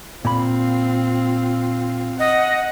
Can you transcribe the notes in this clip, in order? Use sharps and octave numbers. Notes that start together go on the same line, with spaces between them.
A#2 C4 F4 B5
D#5 F#5